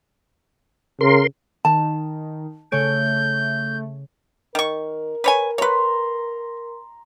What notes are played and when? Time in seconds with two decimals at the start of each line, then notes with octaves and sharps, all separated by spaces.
1.01 C#3 A#4 C6
1.65 D#3 A5
2.72 C#3 A3 C#5 G6 D7
4.55 D#3 A#4 C#6
5.24 B4 C#5 G#5
5.58 B4 C#5 A#5 C6